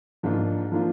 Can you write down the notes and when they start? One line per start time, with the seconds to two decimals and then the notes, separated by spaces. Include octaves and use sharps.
0.23 G#2 F3 A#3 D4 F4
0.72 F3 A#3 D4 F4